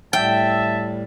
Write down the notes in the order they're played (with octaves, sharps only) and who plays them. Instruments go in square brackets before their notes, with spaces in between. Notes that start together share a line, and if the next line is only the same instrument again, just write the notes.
[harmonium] A2 G3 [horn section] E5 [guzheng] G5 [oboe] A5